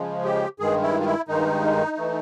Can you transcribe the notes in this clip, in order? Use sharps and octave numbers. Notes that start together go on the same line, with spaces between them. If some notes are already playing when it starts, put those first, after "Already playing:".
Already playing: C#3 F3 G#3
G4
G2 D#3 G#3 G#4
E4
F4
E4
G2 D#3 G#3 D#4
E3 A3